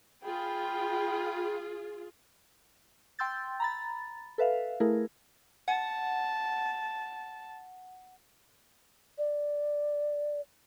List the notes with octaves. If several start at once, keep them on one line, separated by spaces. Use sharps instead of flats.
F4 G#4 G5 B5
G5 C6 E6 G6 A6
A#5 B5 A6
A4 B4 E5 F5
A3 E4 G#4 A#4
F#5 A5
D5